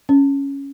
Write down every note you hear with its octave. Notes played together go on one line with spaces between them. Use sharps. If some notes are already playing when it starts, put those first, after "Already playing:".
C#4